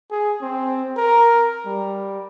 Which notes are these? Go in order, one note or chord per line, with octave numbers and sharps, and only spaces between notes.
G#4
C4
A#4
G3